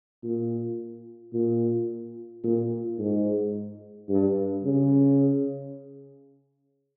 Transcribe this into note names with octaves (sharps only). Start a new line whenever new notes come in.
A#2
A#2
A#2
G#2
G2
C#3